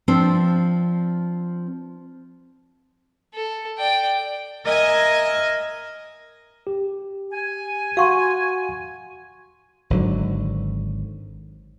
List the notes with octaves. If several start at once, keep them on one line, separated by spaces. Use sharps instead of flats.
F3 C4 D4
A4
D5 G5
A#4 D#5 E5 G#5 D#6 G#6
G4
G#5
F#4 F5 F#5 C6 C#6
G#1 D3 F#3